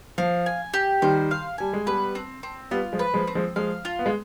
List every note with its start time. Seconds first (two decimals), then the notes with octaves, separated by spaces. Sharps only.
0.18 F3 F5
0.46 G#5
0.74 G4
1.02 D#3 G3 C5
1.31 F5
1.58 G3 G#5
1.73 G#3
1.86 G3 B3 B4
2.15 C4
2.43 C4
2.71 G3 B3 F4
2.93 F3 G#3
2.99 B4
3.14 F3 G#3
3.27 C4
3.35 F3 G#3
3.56 F3 G#3 F5
3.85 F4
3.99 B3
4.06 G#3